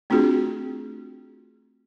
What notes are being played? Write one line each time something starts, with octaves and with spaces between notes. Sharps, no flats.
A3 C4 D4 F4 F#4 G#4